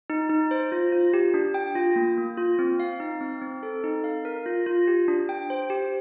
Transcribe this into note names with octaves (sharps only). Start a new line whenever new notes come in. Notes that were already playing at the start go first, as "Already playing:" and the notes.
D#4
D#4
C5
F4
F4
G4
D4
G5
F4
A#3
A#3
F4
C4
F5
D#4
C4
C4
A4
D#4
F5
A#4
F4
F4
G4
D4
G5
C5
G4